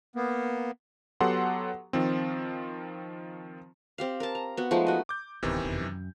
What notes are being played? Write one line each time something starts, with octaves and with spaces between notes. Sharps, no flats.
A#3 B3
F#3 B3 G4 A4 F#5 C6
D#3 F3 C4
C4 G4 F5
A#4 A5
A#5
B3 F#4
F3 G#3 A3 D#4
F#4 D#5
D6 G6
D1 C#2 C3 D#3 E3 B3
F1 E2 B2
F#2